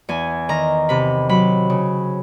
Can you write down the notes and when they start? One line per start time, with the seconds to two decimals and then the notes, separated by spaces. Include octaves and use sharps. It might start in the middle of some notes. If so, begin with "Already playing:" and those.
0.09 E2 G#5
0.49 D#3 A#5
0.89 C3 B5
1.29 F#3 B5
1.70 C#3